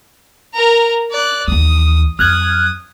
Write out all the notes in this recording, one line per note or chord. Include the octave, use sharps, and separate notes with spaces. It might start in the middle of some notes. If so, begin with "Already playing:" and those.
A#4 A#5
D5 F#6
D#2 E3 D#6
F2 F#3 D#6 F6 F#6 G#6